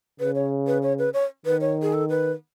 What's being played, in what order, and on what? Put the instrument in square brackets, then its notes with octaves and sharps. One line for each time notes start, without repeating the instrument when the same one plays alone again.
[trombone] C#3 [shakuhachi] B4
[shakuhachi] C#5
B4
C#5
B4
C#5
[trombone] D#3 [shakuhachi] B4
[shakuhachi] C#5
G#4
A4
B4